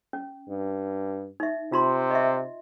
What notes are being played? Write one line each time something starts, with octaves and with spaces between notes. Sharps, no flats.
C#4
G2
D#4 E5
C3 F4 A#5 C6
D#5 E5